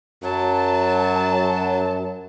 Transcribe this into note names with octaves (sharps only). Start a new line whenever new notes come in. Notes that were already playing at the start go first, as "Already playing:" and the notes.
F#2 F#3 A5